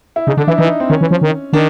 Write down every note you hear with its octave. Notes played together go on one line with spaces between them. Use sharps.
E4
C#3 D#4
D3 D4
E3 E4
E3 D#4
C4
D#3 C#4
E3
F3
D#3
D#3 D4